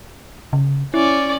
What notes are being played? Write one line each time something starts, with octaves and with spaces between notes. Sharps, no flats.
C#3
C#4 E4 D5